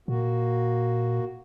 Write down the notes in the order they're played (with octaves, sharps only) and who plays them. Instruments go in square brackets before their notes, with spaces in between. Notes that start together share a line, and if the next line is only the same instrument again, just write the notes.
[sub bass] A#2 [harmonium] A#3 F#4